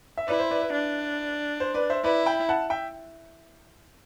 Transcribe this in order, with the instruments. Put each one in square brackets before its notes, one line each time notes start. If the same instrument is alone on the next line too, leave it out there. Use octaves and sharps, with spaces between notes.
[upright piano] E5
[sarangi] E4 [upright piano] B4 D5
[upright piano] C5
B4 D5
B4
[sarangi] D4
[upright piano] C5
B4 D5
C5 E5
[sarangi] E4 [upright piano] B4 D5
[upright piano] G5 B5
F#5 A5
E5 G5